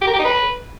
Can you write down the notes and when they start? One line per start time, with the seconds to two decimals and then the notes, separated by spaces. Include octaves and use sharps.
0.01 G4
0.07 A#4
0.13 G4
0.19 D#4
0.25 B4